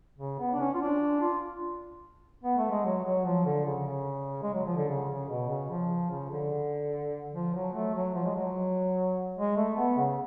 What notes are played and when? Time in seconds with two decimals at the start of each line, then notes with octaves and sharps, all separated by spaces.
0.19 C#3
0.39 B3
0.53 D4
0.60 C#4
0.74 F4
0.81 D4
1.21 F4
2.44 B3
2.58 A3
2.70 G#3
2.85 F#3
3.05 F#3
3.25 F3
3.46 D3
3.66 C#3
3.86 C#3
4.43 G#3
4.54 F#3
4.66 F3
4.77 D3
4.89 C#3
5.09 C#3
5.29 B2
5.49 C#3
5.70 F3
6.10 C#3
6.31 D3
7.33 F3
7.54 F#3
7.74 A3
7.94 F#3
8.14 F3
8.25 G#3
8.35 F#3
9.37 G#3
9.57 A3
9.77 B3
9.98 C#3